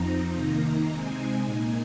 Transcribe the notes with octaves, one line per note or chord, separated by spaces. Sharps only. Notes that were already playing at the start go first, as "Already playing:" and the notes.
Already playing: F2 F3 C4 D#4 A#5
C3 D#3 A#3 D#4
C3 G#3 C4 D#4 G#5
A#2 A#3 D#4